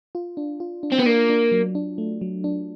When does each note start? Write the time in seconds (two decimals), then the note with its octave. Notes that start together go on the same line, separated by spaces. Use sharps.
0.15 F4
0.37 D4
0.60 F4
0.83 D4
0.92 C4
0.99 B3
1.06 A#3 D4
1.30 D4
1.52 F#3
1.75 D4
1.98 A3
2.21 F#3
2.44 D4